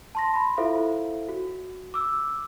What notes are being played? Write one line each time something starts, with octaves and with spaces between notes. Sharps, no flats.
A5 C6 A#6
B5 C6
E4 F4 A4 C5 E5 F5
F#4
D6 E6